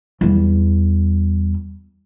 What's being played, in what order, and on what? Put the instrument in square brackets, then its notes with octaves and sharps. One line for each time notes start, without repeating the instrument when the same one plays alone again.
[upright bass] E2 G3